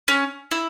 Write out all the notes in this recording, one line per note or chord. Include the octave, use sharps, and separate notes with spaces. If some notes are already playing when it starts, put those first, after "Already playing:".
C#4
E4